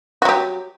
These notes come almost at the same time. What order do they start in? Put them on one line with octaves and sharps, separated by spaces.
F#4 F#3 G4